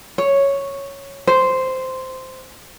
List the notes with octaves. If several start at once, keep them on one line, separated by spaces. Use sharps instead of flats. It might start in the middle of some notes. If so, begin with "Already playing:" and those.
C#5
C5